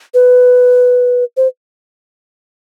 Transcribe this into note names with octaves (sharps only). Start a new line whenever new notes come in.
B4
C5